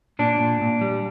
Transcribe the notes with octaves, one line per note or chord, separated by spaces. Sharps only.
A#2 D4
A#2
A#2
G3